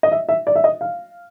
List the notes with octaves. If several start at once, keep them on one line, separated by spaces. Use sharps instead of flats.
D#5
E5
E5
D5
E5
D#5
F5